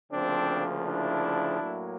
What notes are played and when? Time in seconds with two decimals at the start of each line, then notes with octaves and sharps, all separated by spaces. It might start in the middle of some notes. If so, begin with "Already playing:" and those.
0.12 D2 C#3 F3 A#3 C4 D4
0.86 D4 E4
1.60 A2 F#3 A#3